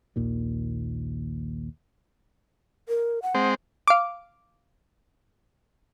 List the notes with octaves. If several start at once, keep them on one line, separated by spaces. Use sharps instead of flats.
A#1 D#2 A#2 D#3
A#4
F#5
G#3 C4 C5
F5 D6